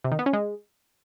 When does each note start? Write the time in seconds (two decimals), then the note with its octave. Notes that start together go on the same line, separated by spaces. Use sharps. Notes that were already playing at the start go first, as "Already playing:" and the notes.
0.04 C3
0.12 D#3
0.19 B3
0.26 C#4
0.33 G#3